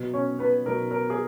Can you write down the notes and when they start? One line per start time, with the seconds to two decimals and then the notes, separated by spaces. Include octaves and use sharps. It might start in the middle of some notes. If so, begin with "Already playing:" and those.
Already playing: B2 F#3
0.13 C#4 C#5
0.39 B3 B4
0.66 B2 F#3 A#4
0.91 A#4
1.10 G#4